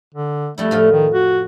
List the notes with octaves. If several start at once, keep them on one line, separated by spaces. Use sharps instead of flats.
D3
F2 G3 A3 E4
A2 F3 F4
D#3
F#4